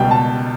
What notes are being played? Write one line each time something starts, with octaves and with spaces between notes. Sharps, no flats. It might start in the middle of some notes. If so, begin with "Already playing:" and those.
Already playing: C#2 B2 G3 G5
A5